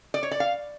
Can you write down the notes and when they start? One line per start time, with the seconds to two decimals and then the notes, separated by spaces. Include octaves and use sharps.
0.14 D5
0.23 C#5
0.31 D5
0.40 F5